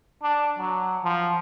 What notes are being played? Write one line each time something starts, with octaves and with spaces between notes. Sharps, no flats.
D4
F#3
F3